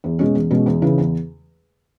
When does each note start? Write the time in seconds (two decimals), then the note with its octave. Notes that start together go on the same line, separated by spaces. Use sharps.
0.04 E2
0.19 B2 G#3 C#4
0.35 E2
0.51 B2 G#3 C#4
0.66 E2
0.82 C#3 E3
0.98 E2